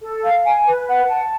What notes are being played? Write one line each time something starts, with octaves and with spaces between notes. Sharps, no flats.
A4
F5
G#5
B4
F#5
A5